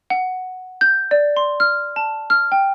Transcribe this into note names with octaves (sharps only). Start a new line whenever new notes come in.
F#5
G6
D5
C6
F6
A5
F6
G5